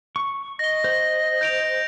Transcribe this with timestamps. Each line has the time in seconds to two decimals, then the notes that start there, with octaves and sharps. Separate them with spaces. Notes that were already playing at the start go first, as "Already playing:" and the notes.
0.16 C#6
0.59 D#5 A#6 G7
0.84 C5
1.41 G6 D7 F7